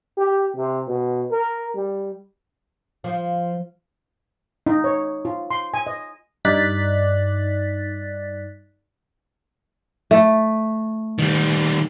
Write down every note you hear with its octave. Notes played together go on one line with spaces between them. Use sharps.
G4
C3
B2
A#4
G3
F3
D#4
C#5
F4
C6
G#5
D#5
G2 D#4 D5 F#6 A6 B6
A3
D#3 G3